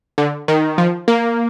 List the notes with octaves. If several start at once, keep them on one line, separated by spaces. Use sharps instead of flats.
D3
D#3
F3
A#3